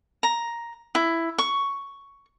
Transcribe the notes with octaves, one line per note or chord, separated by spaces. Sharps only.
A#5
E4
C#6